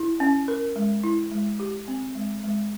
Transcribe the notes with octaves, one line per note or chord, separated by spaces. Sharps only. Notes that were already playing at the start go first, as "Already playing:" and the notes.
Already playing: E4
C#4
A#4
G#3
E4
G#3
G4
C4
G#3
G#3